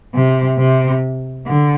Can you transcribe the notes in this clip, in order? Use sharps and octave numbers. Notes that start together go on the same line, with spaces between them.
C3
C3
D3